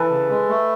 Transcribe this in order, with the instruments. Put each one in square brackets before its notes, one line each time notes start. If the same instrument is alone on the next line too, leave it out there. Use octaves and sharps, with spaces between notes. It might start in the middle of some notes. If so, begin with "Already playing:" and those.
Already playing: [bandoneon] E3 [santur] A4 B4
[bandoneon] C#3
G#3
A3